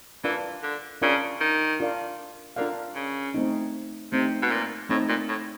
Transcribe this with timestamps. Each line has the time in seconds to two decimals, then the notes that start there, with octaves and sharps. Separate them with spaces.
0.24 E3 D4 F4 A#4 D5 F5
0.63 D3
1.01 C#3 D4 F4 A#4 D5 F5
1.41 D#3
1.80 D4 F4 A#4 D5 F5
2.56 D3 D4 F4 A#4 D5 F5
2.95 C#3
3.34 A3 C4 D#4
4.12 C3 A3 C4 D#4
4.42 B2
4.51 A#2
4.89 A2 A3 C4 D#4
5.09 A#2
5.29 A2